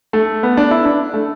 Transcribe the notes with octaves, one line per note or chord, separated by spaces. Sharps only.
A3
B3
D4
E4
D4
A3